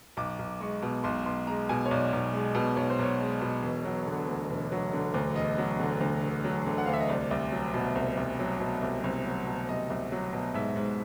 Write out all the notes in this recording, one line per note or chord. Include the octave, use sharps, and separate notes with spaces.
B1 D6
B1
G#3 C#6
B2
B1 C6
B1 C6
G#3 A#5
B2 G#5
C#5
B1 D5
B1
G#3
B2
B1 C#5
C5
B1 C#5
G#3
B2
E1
F#3
D3
D2
E1
F#3
D3
D2
E1 D#5
F#3
D3
D2
E1
F#3
D3
F#5
D2 F5
E5
D#5
C2 D5
C2
F#3
B2
C2
C2
F#3
B2
C2
C2
F#3
B2
C2 D#5
C2
F#3
B2
G#2 E5
G#2